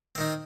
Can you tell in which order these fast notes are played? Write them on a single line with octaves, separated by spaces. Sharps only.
C4 D#3 D#4